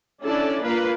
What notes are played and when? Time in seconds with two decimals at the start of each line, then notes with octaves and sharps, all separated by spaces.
0.23 C#4 D4 E4 A4 D5
0.65 A#3 F4 B4 F5